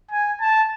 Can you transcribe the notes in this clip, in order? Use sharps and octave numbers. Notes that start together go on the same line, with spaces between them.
G#5
A5